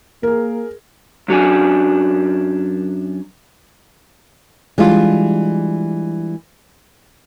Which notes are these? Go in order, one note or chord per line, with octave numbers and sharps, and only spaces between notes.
A#3 G#4 A#4
F#2 F#3 D4 G#5
E3 G3 G#3 D4 F4